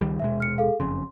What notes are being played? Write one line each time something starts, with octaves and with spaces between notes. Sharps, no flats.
C#2 D#3 G3
D#1 B2 G#3 E5
F6 C#7
G#4 A4 F5
F#1 F2 C#3 C6